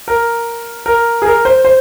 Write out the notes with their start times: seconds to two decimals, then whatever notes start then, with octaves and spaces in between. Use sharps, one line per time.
0.08 A#4
0.86 A#4
1.22 G#4
1.25 A#4
1.45 C5
1.65 C5